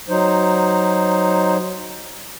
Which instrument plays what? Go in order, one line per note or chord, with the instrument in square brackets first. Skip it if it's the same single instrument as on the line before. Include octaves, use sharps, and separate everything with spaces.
[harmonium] F#3 D#4 C5